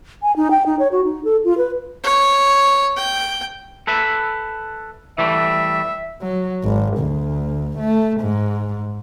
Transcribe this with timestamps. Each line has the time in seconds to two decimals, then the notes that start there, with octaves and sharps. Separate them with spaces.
0.23 G#5
0.36 D#4
0.51 G5
0.66 D#4
0.79 C#5
0.92 F#4
1.04 D#4
1.25 A4
1.44 F4
1.58 B4
2.04 C#5
2.97 G5
3.87 A4 B4 E5
5.18 E3 G3 A3 E5
6.22 F#3
6.64 G#1
6.98 D2
7.79 A3
8.21 G#2